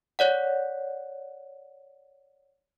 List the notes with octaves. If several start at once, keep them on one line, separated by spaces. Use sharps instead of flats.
C#5 D5 F#5